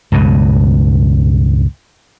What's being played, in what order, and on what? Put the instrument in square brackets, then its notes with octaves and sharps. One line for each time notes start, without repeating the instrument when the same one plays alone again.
[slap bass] C#2 G2 B2